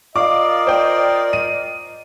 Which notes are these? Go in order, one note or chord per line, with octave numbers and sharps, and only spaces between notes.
F4 A#4 D5 D#5 F5 D6
C5 G5
D#7